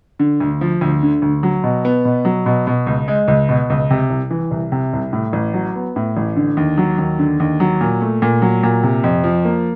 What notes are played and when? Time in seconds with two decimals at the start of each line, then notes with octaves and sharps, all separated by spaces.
0.19 D3
0.40 D2
0.61 F3
0.81 D2
1.03 D3
1.22 D2
1.43 F#3
1.63 B2
1.85 B3
2.05 B2
2.25 F#3
2.46 B2
2.67 B2
2.87 C#2
3.08 G#3
3.28 C#2
3.49 B2
3.70 C#2
3.91 C3
4.10 C2
4.31 E3
4.51 C2
4.72 C3
4.93 C2
5.13 A2
5.33 A1
5.54 F#3
5.75 B3
5.96 A2
6.17 A1
6.36 D3
6.57 D#2
6.78 F#3
6.98 D#2
7.19 D3
7.40 D#2
7.60 F#3
7.81 A#2
8.02 A3
8.22 A#2
8.42 F#3
8.63 A#2
8.83 C3
9.04 F2
9.24 F3
9.45 A#3